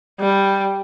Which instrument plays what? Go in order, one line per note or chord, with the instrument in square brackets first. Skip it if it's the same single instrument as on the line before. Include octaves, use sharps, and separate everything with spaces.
[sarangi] G3